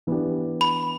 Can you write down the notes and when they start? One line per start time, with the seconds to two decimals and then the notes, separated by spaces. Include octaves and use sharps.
0.07 E3 B3 D4 G4
0.61 B5